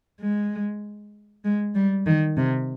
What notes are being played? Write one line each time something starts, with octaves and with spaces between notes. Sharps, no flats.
G#3
G#3
G3
D#3
C3